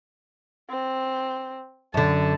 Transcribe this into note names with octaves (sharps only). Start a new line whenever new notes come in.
C4
F#2 D3 A5